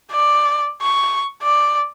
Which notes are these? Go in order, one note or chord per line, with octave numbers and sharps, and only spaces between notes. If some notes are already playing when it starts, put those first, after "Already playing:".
D5
C#6
D5